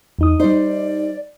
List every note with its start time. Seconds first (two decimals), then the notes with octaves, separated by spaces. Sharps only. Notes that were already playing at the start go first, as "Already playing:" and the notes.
0.19 E2 D#4 D#6
0.40 G3 D#4 C5 D5